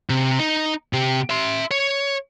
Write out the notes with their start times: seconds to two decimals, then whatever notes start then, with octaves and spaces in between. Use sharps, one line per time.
0.09 C3
0.39 D#4
0.93 C3 G4
1.30 E5 C6
1.71 C#5